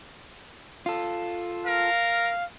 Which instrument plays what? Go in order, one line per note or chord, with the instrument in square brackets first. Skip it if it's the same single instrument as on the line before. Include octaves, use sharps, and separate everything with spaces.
[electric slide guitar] F4 A4
[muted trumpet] A#4 [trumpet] F5